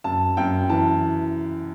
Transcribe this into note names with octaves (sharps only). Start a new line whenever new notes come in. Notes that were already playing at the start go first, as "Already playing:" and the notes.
F#2 A5
F#2 G5
E3 A5